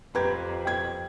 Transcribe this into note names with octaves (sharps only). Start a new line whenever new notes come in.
F2 G4 B4 A#5 G#6
G5 G#6